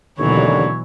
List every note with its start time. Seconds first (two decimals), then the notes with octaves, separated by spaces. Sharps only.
0.19 A1 D#2 B2 D3 E3 F#3 C#5